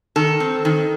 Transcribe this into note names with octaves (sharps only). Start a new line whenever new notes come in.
D#3 A4
C4
D#3